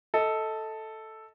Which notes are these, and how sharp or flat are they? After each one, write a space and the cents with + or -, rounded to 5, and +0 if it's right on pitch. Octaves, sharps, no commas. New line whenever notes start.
A4 +0 D#5 +30